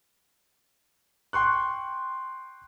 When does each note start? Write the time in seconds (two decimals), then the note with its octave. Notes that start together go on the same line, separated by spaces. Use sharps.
1.33 G5 C6 C#6 F#6